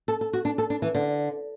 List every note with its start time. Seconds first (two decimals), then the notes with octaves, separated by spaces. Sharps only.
0.08 A4
0.21 A4
0.33 F#4
0.45 D4
0.58 A4
0.70 D4
0.82 E3
0.95 D3